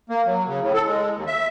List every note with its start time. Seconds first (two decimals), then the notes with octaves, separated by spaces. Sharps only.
0.10 A#3
0.26 F#3
0.47 C#3
0.61 A2
0.74 A4
0.85 G#3
1.15 D#2
1.27 E5